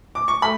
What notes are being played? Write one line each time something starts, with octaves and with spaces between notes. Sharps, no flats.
D6
C#6
A3 B5